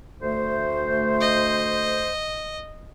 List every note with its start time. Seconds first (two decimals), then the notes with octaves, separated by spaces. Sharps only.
0.22 D2 A3 C5
1.21 D#5